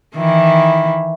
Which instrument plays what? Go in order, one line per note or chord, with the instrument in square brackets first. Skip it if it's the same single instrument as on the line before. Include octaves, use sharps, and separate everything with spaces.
[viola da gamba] D#3 E3 E4